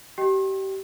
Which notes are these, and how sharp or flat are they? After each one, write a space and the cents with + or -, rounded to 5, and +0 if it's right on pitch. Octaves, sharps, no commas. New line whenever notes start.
G4 -30 D#5 +0 G5 -5